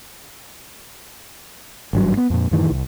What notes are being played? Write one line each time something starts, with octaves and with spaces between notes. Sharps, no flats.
G#1 G2 F#3
B3
F2 A#2
F#2 A2 D#3 E3
C2